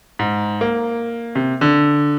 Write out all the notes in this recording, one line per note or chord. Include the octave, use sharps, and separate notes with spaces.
G#2
A#3
C3
D3